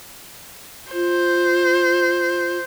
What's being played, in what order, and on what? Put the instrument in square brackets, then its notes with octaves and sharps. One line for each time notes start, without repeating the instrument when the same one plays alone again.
[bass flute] F4 [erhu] C5